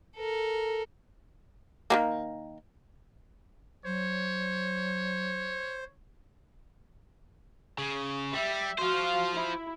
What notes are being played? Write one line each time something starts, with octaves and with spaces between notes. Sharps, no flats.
A4 A#4
D#3 G#3 A#3
F#3 C5 C#5
C#3
G3 E5
F4 F#4 C5 F5
E4